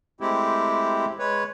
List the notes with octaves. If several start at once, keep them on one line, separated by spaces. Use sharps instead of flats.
G#3 A3 C4 E4 G4
G#3 B4 C#5